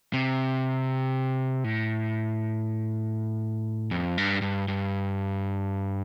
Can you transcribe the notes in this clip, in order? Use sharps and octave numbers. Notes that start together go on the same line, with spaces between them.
C3
A2
F2
G2
G2
G2